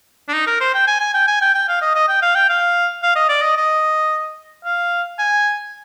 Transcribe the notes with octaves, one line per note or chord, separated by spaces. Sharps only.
D4
D#4
A#4
C5
G5
G#5
G#5
G5
G#5
G5
G5
F5
D#5
D#5
G5
F5
G5
F5
F5
D#5
D5
D#5
D#5
F5
G#5